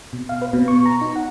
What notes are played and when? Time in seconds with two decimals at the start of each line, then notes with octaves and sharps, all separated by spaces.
0.13 B2
0.29 F5
0.42 B4
0.53 B2
0.68 C#6
0.86 A#5
1.01 D#4
1.16 F#5